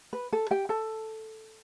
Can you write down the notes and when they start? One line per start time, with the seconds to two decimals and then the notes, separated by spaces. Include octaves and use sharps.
0.13 B4
0.33 A4
0.51 G4 G5
0.69 A4 A5